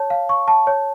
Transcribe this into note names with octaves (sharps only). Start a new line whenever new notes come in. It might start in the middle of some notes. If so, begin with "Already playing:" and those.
Already playing: C#5 A5
F5
C#6
A5
C#5